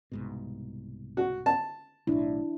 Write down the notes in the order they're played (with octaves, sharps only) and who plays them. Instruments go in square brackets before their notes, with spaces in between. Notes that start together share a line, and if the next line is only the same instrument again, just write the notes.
[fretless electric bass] C2 G#2 B2
[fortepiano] F#4
A5
[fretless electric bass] B1 A2 [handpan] D4 E4